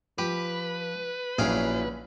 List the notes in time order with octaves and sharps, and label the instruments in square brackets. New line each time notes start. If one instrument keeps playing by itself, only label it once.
[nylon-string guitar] F3 [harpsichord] G4 [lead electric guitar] B4
[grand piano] A#1 C#4 [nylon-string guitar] F#3 E4 [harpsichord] G#4 F5 G5